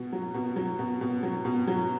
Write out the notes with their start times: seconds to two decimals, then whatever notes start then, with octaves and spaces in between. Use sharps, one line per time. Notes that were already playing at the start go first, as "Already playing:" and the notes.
Already playing: B2
0.12 F#3
0.34 B2
0.56 F#3
0.79 B2
1.01 B2
1.23 F#3
1.45 B2
1.67 F#3